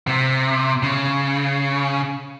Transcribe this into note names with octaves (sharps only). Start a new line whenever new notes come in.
C3
C#3